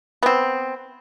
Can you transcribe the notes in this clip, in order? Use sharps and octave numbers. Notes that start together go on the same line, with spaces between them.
B3 C4